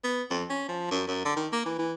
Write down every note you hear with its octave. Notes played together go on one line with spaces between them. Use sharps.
B3
F2
C#4
F3
F#2
F#2
D3
D#3
A#3
E3
E3